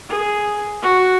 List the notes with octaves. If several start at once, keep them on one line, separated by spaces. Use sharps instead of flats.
G#4
F#4